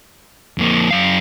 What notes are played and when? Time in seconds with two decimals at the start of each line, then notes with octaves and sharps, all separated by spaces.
0.58 F2 A#3
0.91 F#2 F5